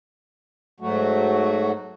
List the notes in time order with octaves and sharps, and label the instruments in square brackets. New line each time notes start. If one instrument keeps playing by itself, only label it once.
[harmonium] G#2 F#3 A3 F#4